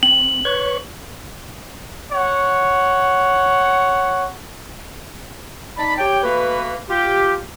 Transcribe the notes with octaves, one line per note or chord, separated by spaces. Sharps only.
C4 F#7
B4 C#5 C#6
C#5 F#5
D#4 D5 A5 B5
G4 C#5 G5
A3 A#3 F#4 B4
F4 G4